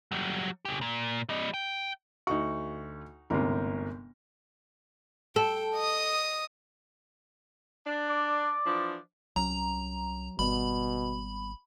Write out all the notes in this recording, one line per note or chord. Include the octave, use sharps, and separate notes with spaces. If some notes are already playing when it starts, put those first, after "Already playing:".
F#3 G3
C#3 G4
A#2
G3 D#5
G5
D2 D#4 F#4 C#6
G1 D2 G#2 C3 A#4
A4 G5
D#5 D#6
D4
D5
E3 F3 D4
C2 F#3 C#4 A#5
G#1 B2 G3 A#3 B3 B5